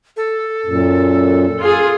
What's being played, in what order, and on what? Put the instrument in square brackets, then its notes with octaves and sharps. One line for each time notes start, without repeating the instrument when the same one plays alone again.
[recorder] A4
[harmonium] F#2 A#2
[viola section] F4 G#4